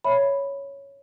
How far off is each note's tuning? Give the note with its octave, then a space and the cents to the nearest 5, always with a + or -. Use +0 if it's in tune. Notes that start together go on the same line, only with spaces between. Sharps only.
C#5 +0 E5 +0 B5 +0